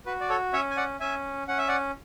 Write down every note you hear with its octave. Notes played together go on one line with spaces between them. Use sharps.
F#4 B4
D5
A4 C#5
C#4 C#5 E5
G#5
D5 F#5
C#4 E5 G#5
C#4 F#5
E5
D5 F#5